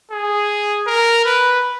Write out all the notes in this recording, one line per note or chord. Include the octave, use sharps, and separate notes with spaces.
G#4
A#4
B4